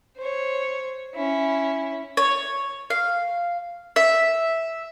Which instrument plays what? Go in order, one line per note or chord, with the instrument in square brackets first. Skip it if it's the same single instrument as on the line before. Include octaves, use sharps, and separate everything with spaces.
[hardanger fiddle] C5 C#5
C#4 E4
[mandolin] C#5
F5
E5